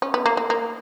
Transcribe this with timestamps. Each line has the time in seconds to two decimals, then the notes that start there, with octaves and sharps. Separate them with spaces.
0.02 C#4
0.14 B3
0.26 A#3
0.37 A#3
0.50 A#3